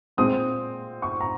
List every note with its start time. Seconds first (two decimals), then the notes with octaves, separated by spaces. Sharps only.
0.17 A#2 G#3 C4 D#6
1.02 C#6
1.21 A#5